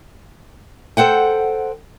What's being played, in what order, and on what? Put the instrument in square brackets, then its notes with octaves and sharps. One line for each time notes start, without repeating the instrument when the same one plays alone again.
[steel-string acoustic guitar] A4 C5 F#5 G5